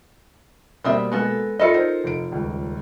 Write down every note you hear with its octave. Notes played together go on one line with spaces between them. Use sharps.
B2 G3 A#3 C4 E5 D#6
G#3 B3 A4
F4 A4 D#5 E5 B5 C#7
D#4 A#4 C5
F1 D7
D#1 C#2